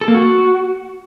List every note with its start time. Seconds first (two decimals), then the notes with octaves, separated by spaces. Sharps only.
0.01 A4
0.08 A#3
0.14 F#4